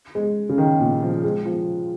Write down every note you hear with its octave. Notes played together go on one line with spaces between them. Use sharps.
G#3
C#3
D#3
A#2
F3
G#3
F3